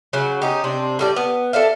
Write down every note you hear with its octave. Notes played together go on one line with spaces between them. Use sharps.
C#3 F#3
C#4 D#4 G4
C3 C4 D4
A2 G3 D5
B3
A4 D5 E5 F5